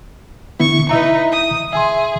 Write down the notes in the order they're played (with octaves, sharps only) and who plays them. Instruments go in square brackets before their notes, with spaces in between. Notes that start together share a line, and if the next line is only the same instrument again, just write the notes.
[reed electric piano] D3 B3 E4 [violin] C#6
[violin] D#4 B4 [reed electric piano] E4 E5 A#5
[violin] D#6
[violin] G#4 [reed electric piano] E5 G#5 C6